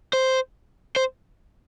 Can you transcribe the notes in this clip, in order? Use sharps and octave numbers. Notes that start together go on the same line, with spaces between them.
C5
C5